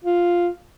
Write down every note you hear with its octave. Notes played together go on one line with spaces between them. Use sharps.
F4